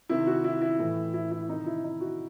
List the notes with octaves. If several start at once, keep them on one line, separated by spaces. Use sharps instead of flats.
C3 D#3 E4
F#4
E4
E4
A2 E3
E4
E4
C3 D#3 D#4
E4
D#4
F#4